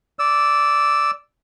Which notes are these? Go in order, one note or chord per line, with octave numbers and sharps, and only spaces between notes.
D5 E6